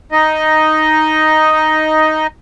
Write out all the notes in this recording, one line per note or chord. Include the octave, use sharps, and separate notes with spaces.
D#4 D#5